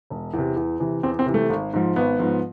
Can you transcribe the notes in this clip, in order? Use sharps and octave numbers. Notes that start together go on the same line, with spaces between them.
E1
E2
C3
E2
C3 E3
E2 C4
C4
C3 E3
A3
G#1
G#2 F3
G#1 B3
G#2 F3